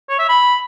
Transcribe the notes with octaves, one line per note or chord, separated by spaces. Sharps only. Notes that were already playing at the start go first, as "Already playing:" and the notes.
C#5
E5
B5